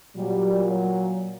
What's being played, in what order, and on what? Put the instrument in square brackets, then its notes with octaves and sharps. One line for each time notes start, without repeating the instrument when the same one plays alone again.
[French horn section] A#2 F#3 G3
F#3